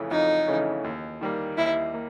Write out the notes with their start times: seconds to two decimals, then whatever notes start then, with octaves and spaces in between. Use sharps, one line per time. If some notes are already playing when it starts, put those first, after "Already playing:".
Already playing: F2 C#3 E3 A3 C#4
0.11 F2 D#4
0.47 C#3 E3 A3 C#4
0.84 D#2
1.21 D#3 G3 A#3
1.58 D#2 E4
1.94 A#3